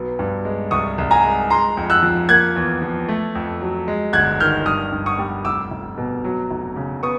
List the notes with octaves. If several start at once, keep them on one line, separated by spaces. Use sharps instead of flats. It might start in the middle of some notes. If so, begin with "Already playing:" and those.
Already playing: B1 F#3 B3
G2
G#3
C2 C#6 D#6
C2
G#5 A#5
G#3
G#3 A#5 C6
F2
E6 F#6
F3
A#3 F#6 G#6
E2
F3
A3
F2
F#3
G#3
G1 F#6 G#6
D#3 F6 G6
G2 D#6 F6
G2
C#6 D#6
G3
F1 D6 E6
F1
B2
F#3
F1
C#3
B3 C#6 D#6